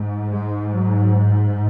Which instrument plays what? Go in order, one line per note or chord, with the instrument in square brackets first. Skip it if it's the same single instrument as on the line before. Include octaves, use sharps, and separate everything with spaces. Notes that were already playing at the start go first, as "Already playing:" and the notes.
Already playing: [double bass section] G#2
G#3
F#3